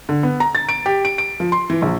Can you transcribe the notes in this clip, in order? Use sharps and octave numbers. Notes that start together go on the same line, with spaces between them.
D3
B3
A#5
A6
D7
G4
D7
D7
F3
C6
E3
A#1